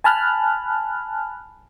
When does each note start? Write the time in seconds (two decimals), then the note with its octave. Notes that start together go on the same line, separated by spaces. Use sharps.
0.04 G#5 A5 B5 F6 F#6